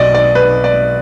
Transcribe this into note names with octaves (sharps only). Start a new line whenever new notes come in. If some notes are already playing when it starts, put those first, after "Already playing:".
Already playing: B1 B2 F#3 D5 D#5
D5
B4
D5